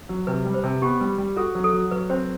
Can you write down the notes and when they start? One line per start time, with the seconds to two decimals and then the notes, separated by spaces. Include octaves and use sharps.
0.09 F#3
0.27 C3 B4
0.45 G3
0.54 C5
0.64 C3
0.82 B3 G4
1.01 G3
1.18 G3
1.36 F#4 A4
1.55 F#3
1.64 A4
1.73 F#3
1.91 F#3 B4
2.10 C4 C5